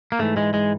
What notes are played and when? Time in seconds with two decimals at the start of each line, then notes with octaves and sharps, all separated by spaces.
0.12 A#3
0.19 G#2 E3 A3
0.37 G#3
0.54 G#3